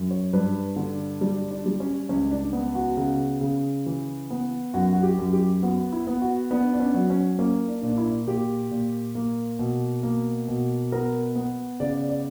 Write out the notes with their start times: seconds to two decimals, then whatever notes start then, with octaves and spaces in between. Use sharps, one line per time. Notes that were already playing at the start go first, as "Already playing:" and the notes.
Already playing: F#2
0.11 C#5
0.33 G2 B4
0.76 D3
1.21 G3 D4
1.51 D4
1.66 G3
1.80 C#4
2.09 C#2 C#4
2.31 D4
2.53 B3
2.75 F#4
2.97 C#3
3.41 C#3
3.86 E3
4.30 B3
4.74 F#2 F#4
4.93 F#4
5.03 G4
5.18 F#2
5.33 G4
5.63 B3 F#4
5.92 E4
6.07 B3
6.22 F#4
6.51 B3 D4
6.73 D4
6.80 C#4
6.94 F#3
7.10 C#4
7.39 A#3 C#4
7.68 D4
7.83 A#2
7.89 D4
7.97 E4
8.27 A#2 G4
8.71 A#2
9.15 A#3
9.59 B2
10.03 A#3
10.48 B2
10.92 B3 A#4
11.36 B3
11.80 C#3 D5
12.09 D5